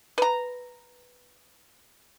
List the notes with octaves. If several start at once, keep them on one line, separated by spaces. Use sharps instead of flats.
B4 A#5